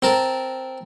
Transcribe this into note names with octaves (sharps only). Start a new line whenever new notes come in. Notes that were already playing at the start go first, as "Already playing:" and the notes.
C4 A#4 A5